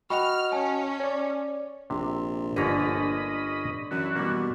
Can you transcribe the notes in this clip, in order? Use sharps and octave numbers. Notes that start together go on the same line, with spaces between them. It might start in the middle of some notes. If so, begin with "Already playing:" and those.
F#4 D#5 F#5 G5 B5 C#6 F6
C#4 G#5 A5
C#5 D5
A#1 C3
G1 D3 A#3 C#4 D#5 A#5 B5
F#2 E3 F#4
B2 G3 A#3